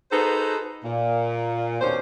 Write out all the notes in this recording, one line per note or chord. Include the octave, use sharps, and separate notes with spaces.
D#4 F#4 G#4 A4 B4 C5
A#2
D#2 B2 C#4 D4 C5